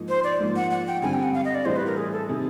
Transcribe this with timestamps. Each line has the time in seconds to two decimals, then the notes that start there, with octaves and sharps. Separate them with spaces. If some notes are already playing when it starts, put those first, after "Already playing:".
Already playing: G#2 F3 A#3 D#4
0.09 C5
0.24 D5
0.40 G#2 F3 A#3
0.56 F#5
0.71 F#5
0.87 G5
1.02 G2 D3 G3 C4 G#5
1.14 G5
1.23 F#5
1.34 F5
1.45 D#5
1.55 D5
1.65 A2 E3 G3 C5
1.76 B4
1.86 A#4
1.97 G#4
2.12 A4
2.28 C3 D#3 G#4